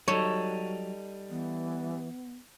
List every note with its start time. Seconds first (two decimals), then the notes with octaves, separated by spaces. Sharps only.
0.08 F#3 G3 D#4 A4 C#5
1.30 E3 B3